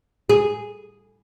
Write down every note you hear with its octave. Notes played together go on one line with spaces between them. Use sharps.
G#4